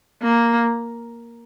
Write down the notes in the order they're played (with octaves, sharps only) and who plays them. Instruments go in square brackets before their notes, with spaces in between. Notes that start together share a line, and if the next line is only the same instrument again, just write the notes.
[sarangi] A#3